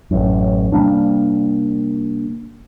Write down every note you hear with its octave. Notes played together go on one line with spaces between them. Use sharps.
A1 F#2
C3 G3 A#3 D4